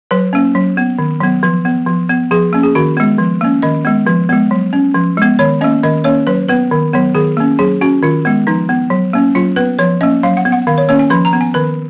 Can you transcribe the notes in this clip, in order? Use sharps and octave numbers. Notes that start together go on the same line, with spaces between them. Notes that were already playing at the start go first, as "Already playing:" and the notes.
F#3 B4
A#3 C#4
F#3
B3
D#3
F#3 B3
F3
B3
F3
B3
F3 G#4
A#3 C#4
G#4
D#3 F#4
G#3 B3
F3
A#3 C#4
D#3 D#5
G#3 B3
F3
G#3 B3
F#3
C#4
F3
G#3 B3
D#3 C#5
A#3 C#4 D#5
D#3 D#5
A#3 C#4 C#5
F#3 B4
B3 B4
D#3
F#3 B3
D#3 G#4
A#3 C#4
F#3 G#4
C#4 F#4
D#3 F4
G#3 B3
F3 D#4
B3
F#3
A#3 C#4
F#3 F4
B3 B4
F3 C#5
A#3 C#4 D#5
F#3 F5
F#5
B3
F#5
D#3 F5
C#5
A#3 C#4 C#5
G#5
F3 B5
A#5
B3
G#5
D#3 B4